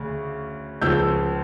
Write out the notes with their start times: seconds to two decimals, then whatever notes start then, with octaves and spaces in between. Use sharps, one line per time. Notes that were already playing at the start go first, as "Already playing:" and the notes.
Already playing: D2 C#3
0.81 C#2 C#3 F3 E6 G6